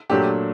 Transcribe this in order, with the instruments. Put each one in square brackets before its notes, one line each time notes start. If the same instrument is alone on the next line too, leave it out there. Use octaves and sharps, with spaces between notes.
[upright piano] A#2 F#3 A3 D4 [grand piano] G4